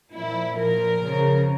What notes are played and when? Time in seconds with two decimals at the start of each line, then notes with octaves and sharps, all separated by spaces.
0.14 A#2 F3 E4
0.57 A#2 F3 A#4
1.01 C#3 F3